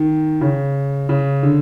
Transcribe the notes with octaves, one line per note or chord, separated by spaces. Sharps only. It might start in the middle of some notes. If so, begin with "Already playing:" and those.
Already playing: D#3
C#3
C#3
D3